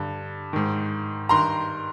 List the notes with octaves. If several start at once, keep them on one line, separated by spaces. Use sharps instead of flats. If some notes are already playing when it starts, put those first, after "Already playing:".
Already playing: G2 D3
G#2 D#3
G2 D#3 A#5 C6